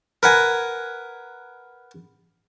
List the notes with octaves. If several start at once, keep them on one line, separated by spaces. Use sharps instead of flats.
A#4 B4 F#5 G#5